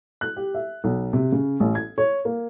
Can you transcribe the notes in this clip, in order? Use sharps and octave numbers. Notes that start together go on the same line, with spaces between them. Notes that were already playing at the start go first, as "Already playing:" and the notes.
F#6
G4
E5
B1
C3
C#3
A1
G#6
C#5
A#3